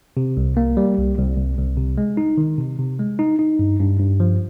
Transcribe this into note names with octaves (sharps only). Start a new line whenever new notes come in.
C3
C2
A#3
G3
C2
C2
C2
C2
C3
G#3
D#4
D#3
C3
C3
G#3
D#4
D#4
G2
G2
G2
F3